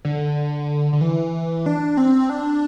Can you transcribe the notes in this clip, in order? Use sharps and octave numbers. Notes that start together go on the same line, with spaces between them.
D3
D3
E3
D4
C4
D4